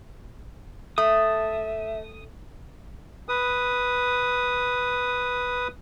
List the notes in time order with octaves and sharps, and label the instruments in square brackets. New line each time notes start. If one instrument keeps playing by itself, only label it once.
[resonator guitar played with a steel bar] A3 [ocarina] E5 [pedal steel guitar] D#6
[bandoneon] B4 D#6